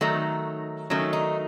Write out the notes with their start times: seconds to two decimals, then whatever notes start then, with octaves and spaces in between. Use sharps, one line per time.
0.01 D#3 F#3 A3 D#4
0.90 D#3 F#3 A3 C#4
1.13 D#4